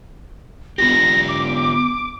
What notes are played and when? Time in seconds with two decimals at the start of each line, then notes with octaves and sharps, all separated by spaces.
0.78 B3 F4 G4 A#6
1.28 D6